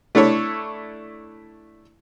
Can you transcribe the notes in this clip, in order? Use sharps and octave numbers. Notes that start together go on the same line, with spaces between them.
A3 D4 E4 A4 C#5